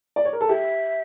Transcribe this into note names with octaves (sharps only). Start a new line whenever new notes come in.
D5
C#5
A#4
A4
G4 E5